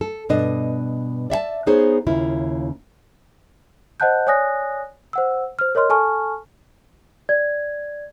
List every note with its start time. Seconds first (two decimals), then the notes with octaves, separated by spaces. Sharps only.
0.01 A4
0.29 G2 B2 D4 D#5
1.30 D5 E5 F#5 A5
1.67 B3 D#4 G#4 C5 C#5
2.07 D#2 C#3 E4 F4
4.00 C5 D#5 F#5 A5 F#6 G6
4.27 C#5 D5 G#5 D#6 F#6 A#6
5.13 C5 F#5 E6
5.59 C5 F6
5.75 A#4 C#5 D#5 C6 F6
5.90 A4 G#5 A5 C#6 F6
7.29 D5 G#6